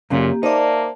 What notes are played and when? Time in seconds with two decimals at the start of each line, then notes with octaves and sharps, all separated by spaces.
0.10 F#2 A#2 C#3 A#3 C#4 G4
0.43 A#3 D#4 C5 D5 E5 A5